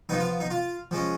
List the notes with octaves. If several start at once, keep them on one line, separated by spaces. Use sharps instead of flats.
F3 B3 D#4
F4
D#4
F4
F3 G#3 C#4